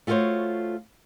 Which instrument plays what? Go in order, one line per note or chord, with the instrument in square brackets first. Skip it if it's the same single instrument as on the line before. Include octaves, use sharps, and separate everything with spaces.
[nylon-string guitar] A3 F4 F#4 A#4 C5 C#5